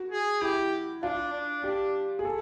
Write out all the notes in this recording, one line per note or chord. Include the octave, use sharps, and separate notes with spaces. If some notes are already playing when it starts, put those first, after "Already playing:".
Already playing: F#4
G#4
E4 G4
D4 F4
D4
D4 G4
G#4
A4